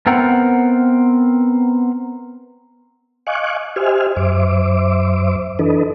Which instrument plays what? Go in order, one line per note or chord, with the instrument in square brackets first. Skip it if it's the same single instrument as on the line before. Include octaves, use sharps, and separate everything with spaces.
[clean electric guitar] B3 C4 A#4 E5 F#5 G5
[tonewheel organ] D#5 F5 G#5 C#6 D6 F#6
G4 C5 D#5 E5 G#5 F6
F#2 C5 E5 D6
E3 D4 A4 B4 D#5